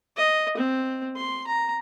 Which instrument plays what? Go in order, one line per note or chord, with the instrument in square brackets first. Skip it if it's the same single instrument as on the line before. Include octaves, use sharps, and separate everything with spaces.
[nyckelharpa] D#5
C4
C6
A#5